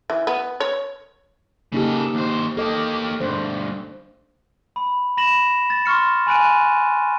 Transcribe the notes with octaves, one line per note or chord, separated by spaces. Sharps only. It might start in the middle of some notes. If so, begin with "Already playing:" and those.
E3
B3
C#5
C#3 A#3 D#4 G4 A4
D#2 C5
A#3 G4 A4 D#5
D2 G2 C5
B5
B5 A#6 E7 F#7
A6
C6 C#6 F6 C#7
G#5 B5 F#6 D7 D#7